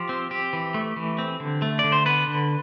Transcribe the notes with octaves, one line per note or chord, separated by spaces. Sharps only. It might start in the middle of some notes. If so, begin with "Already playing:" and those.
Already playing: F3 G4
C4
C4 G4
E3
A3
E3
C4
D3
A3
D5
D3
C5
B3 B4
D3